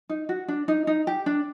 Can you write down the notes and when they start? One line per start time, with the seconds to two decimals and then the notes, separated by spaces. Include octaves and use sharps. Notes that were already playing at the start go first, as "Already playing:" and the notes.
0.10 D#4
0.29 F#4
0.48 D4
0.68 D#4
0.87 D#4
1.07 G4
1.26 D4